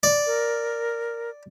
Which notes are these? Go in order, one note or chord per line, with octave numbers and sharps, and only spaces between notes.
D5
A#4